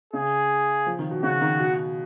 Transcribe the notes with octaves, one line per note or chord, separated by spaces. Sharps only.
C#3 G#4
F3
D#3
B2
C#3 F#4
D#3
B2